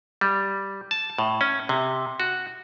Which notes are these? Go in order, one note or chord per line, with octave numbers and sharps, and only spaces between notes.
G3
A5
A2
C#4
C3
F#4